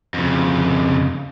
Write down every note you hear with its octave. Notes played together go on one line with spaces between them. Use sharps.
F2 C#3